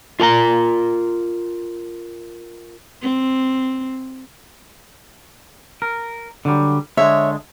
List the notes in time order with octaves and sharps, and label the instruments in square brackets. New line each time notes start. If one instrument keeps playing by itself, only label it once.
[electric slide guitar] F4 A#4 G#5 A#5
[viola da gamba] C4
[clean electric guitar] A#4
D3 F#3 G3
[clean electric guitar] D3 G#3 [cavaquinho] C#5 E5